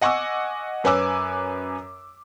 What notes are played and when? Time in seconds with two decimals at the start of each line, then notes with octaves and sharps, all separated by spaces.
0.01 D#5 F#5 G#5 C#6 D6 E6
0.84 F#2 B4 C#5 G#5 D6 E6